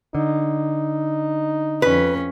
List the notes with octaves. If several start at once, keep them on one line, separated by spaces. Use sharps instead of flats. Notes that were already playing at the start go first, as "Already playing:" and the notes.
D3 D#4
F2 C#4 B4